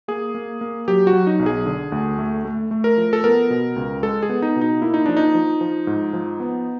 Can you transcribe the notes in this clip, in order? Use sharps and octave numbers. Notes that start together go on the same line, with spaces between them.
A#3 G#4
A#3
A#3
F#3 G4
F#4
F#3
D#4
B1
G#4
D3
D2
A3
A3
A3
A#4
F3
A4
B3 A#4
B2
C#2
G#3 A4
G#4
B3
D#4
B2
D#4
A#3 E4
D#4
F3 D4
D#4
F3
F3
G#2
F3
B3